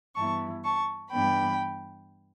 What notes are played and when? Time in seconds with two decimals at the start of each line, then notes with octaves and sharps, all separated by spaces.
0.15 G2 E3 B3 E4 A5 C#6
0.64 A5 C#6
1.11 G2 E3 B3 D4 G5 B5